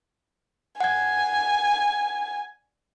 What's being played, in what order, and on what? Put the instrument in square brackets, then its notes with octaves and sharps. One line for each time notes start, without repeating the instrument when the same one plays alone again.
[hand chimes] F#5 G#6 [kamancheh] G#5